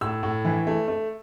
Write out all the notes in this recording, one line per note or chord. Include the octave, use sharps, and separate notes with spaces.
A2 E6
A2
E3
A3
A3